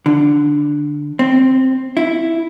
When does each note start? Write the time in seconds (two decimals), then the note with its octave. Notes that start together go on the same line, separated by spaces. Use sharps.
0.06 D3
1.19 C4
1.97 E4